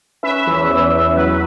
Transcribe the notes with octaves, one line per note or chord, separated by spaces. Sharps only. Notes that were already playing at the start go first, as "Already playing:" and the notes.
C#4 B4 E5
E2
E3
E2
F#3 B4